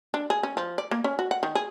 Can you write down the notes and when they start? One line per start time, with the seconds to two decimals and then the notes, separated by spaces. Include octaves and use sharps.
0.14 D4
0.30 G#4
0.43 C#4
0.57 F3
0.78 D5
0.91 A#3
1.04 C#4
1.19 F#4
1.31 F#5
1.43 D#3
1.55 G#4